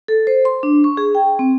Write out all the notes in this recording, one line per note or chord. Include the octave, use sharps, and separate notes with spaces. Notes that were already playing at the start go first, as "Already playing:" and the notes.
A4
C5
C6
D4
C#6
G#4
G5
C4